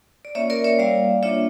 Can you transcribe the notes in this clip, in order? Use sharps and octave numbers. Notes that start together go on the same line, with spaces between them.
D5
A#3 C#4 F4 C#5 E5
A#4 D5
C#5 E5
G3 A#3 E4 D5 F5
A#3 D4 F4 C#5 E5